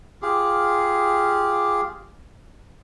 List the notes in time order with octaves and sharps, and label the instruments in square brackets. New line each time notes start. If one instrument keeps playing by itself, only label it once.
[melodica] F4 G4 G#4